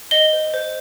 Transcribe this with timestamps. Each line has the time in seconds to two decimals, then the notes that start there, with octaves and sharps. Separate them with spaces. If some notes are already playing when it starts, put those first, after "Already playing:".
0.11 D#5 G7
0.33 C5
0.54 C5